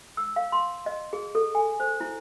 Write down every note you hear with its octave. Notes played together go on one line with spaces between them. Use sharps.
E6
F5
C6
D#5
G#4
A4
G#5
C5
E4